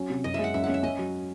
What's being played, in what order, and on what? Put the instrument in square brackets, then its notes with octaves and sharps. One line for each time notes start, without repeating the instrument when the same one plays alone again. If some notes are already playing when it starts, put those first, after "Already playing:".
Already playing: [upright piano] F#3 C#4
C3
[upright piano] F#2 [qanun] D#5
[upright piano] G#3 [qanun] E5
[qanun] F#5
[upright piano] F#2 [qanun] E5
[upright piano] C#4 [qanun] F#5
[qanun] E5
[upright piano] C#4 [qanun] D#5
[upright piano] F#3